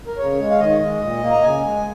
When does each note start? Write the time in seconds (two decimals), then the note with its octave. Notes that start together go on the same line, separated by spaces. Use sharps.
0.07 A#4
0.18 C#3 C#5
0.39 G#3
0.51 F5
0.60 D#3 D#5
0.80 G#3
1.01 A#2
1.21 A#3
1.31 A#5
1.42 C#3 G#5
1.63 G#3